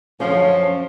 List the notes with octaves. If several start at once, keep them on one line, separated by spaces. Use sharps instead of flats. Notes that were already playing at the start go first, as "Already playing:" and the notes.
F#2 D3 F3 C#4